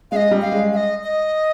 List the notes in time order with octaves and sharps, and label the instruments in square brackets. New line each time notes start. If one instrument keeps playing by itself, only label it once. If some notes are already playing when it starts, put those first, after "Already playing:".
[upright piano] G#3 [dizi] D#5 F5
[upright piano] G3
[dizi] F5
[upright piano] G#3
[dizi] F5
D#5
D#5